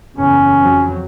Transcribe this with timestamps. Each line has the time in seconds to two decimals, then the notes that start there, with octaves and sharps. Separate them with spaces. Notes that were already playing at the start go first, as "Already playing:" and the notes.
0.16 F#1 E2 C#3 C#4
0.58 F2 F#3 C4